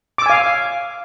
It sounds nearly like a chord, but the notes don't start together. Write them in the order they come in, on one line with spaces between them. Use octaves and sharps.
D6 E6 G#5 F5